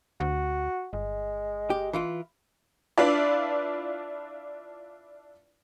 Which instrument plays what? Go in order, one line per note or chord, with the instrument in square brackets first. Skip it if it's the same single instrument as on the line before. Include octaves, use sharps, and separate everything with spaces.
[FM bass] D2 [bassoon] F#4
[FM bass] G1 [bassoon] G#3
[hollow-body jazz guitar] G4
E3 E4 F4
[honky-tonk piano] D4 E4 F4 B4 D5